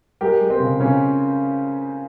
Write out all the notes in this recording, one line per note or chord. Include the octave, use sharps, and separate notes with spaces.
G#3 G4 A#4
G#3
C4
C#3
C#3 C#4